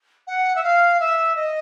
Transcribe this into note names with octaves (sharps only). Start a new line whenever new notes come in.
F#5
E5
F5
E5
D#5